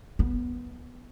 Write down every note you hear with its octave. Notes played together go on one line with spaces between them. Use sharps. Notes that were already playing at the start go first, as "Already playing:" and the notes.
B3